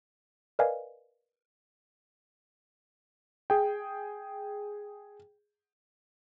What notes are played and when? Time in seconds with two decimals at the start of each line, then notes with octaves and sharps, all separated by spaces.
0.59 A#4 B4 D5 D#5 F5 G#5
3.50 G#4 G5